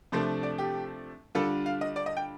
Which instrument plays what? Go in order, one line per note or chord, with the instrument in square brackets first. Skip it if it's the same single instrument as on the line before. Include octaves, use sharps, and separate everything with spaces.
[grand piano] C3 F3 A3 D4 C5
D5
G4
D3 G3 D4 F4 A4
F5
D#5
D5
D#5
G5